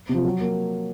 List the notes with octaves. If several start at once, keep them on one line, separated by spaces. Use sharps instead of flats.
C3
F3
F#3
A#3